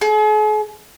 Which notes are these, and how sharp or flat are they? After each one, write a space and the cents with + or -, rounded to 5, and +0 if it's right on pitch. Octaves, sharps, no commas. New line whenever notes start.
G#4 +45